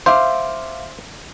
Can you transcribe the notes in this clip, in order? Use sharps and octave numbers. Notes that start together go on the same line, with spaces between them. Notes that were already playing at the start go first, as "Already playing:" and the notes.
C5 E5 F5 D6